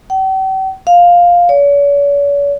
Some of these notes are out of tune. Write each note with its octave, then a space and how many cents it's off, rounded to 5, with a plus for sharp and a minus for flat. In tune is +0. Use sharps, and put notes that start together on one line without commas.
G5 -45
F5 +5
C#5 +45